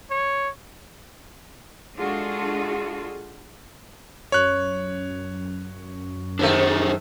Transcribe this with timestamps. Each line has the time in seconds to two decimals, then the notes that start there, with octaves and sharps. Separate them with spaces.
0.11 C#5
1.99 G#3 D4 F4 F#4 G#4 A4
4.32 F#2 C#5 F#6
6.39 G#2 D#3 A3 D4 G4 G#4